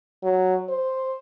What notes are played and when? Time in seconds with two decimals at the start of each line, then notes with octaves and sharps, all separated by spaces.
0.23 F#3
0.69 C5